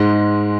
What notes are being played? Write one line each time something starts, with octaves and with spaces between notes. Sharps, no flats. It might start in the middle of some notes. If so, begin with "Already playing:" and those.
Already playing: G#2 G#3